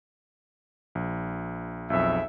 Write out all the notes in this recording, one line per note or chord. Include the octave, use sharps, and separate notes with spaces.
A#1
B1 F2 G#4 E5